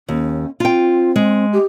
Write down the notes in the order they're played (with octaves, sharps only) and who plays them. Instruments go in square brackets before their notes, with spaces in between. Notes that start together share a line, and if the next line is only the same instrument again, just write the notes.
[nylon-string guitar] D#2 [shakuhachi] C#4
[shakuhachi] C4 [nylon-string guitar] F4 G5
[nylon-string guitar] G#3
[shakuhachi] G4